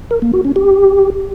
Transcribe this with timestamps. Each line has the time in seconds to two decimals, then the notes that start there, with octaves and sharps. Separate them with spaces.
0.11 A#4
0.22 A#3
0.33 F#4
0.45 C#4
0.56 G4